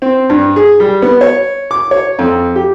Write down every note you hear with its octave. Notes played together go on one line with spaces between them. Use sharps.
C4
G2
G#4
G3
B3
C#5
D6
C#5
F2
G4